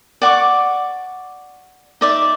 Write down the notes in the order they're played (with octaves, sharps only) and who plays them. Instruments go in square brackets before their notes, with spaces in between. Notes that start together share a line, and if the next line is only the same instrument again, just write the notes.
[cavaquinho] D5 F#5 C#6 D6
D#4 D5 E5